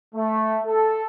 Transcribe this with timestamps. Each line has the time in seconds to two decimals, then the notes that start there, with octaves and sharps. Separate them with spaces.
0.15 A3
0.66 A4